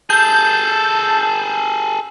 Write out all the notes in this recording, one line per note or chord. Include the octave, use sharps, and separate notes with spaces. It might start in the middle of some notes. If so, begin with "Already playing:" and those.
G#4 A4 A5 G6